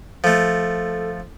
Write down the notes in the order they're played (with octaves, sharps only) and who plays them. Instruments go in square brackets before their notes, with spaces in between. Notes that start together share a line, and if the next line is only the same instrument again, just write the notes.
[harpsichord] F3 A3 [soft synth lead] A4